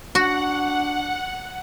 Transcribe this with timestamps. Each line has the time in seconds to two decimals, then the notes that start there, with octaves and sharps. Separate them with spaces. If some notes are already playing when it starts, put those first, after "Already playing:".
0.15 D4 F#4 F#5